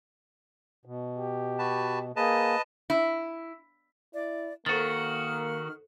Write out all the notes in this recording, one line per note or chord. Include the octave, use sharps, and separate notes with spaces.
B2
G4
F#4 B4 A5
A#3 G#4 B4 D#5 A5
E4
E4 D5
D#3 A#3 F#4 A4 C5 F6 A6